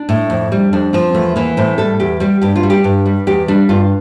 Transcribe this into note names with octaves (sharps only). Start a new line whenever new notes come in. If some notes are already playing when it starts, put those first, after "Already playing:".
Already playing: D4
A2
F2
G3
F2 D4
F3 C4
E2 A3
E3 A#3
A2 C4
G3 A4
E2 G4
G3 G4
G2 G4
F4
G3
G4
G2
G3
E2 G4
G3 D4
G2 F4